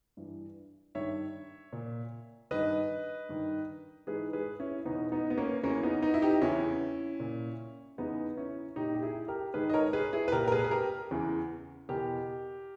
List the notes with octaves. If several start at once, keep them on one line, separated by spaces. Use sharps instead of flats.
G2 E3
G2 D#3 C#5 E5
A#2
G2 D#3 B4 D#5
G2 D#3
G#2 E3 G#4 B4
G#4 B4
C#4 E4
E2 B2 B3 D#4
B3 D#4
B3
A#3 C#4
E2 C#3 E3 A#3 C#4
B3 D#4
B3 D#4
E4
D#4 G4
E2 C#3 E3 C#4 E4
A#2
E2 C#3 E3 B3 D#4
C#4 E4
A#2 D#4 G4
G4
E4 G#4
G4 A#4
G#2 D#3 G#4 B4
D#5
A#4 C#5
G#4 B4
E4 G#4
B4
A#2 G4 A#4
A#4
G#4 B4
G#4
G4 A#4
E2 C#3 E3
E2 B2 G4 A#4